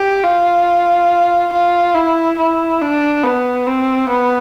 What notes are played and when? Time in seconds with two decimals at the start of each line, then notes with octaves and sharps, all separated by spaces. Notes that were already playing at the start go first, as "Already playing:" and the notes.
Already playing: G4
0.24 F4
1.52 F4
1.94 E4
2.38 E4
2.81 D4
3.23 B3
3.66 C4
4.09 B3